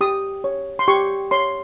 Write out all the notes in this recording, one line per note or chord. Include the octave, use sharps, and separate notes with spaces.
G4 D#6
C#5
C6
G4 C#6
C#5 C6